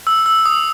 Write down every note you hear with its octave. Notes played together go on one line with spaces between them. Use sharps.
E6
E6
D#6